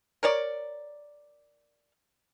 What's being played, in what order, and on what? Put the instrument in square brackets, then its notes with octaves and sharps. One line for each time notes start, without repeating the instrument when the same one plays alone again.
[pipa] A#4 C#5 D5